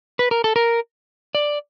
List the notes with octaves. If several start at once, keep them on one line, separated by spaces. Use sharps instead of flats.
B4
A#4
A4
A#4
D5